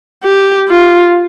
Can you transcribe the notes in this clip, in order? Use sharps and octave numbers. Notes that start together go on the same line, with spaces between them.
G4
F4